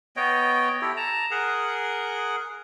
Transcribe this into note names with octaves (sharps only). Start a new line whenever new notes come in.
B3 C#5 D#5 G5
E4 G4 A4
A5 A#5
G#4 A#4 F#5